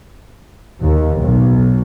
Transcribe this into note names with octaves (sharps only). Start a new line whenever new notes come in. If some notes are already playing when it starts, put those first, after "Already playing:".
D#2
B1